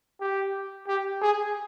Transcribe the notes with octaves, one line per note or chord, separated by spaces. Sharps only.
G4
G4
G#4